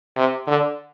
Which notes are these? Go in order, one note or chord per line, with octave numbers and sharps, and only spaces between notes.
C3
D3